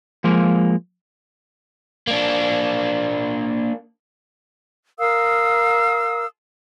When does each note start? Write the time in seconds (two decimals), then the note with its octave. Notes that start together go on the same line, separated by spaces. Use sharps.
0.24 F3 G#3 A#3
2.07 A#3 D4
4.99 A#4 F5 D#6 E6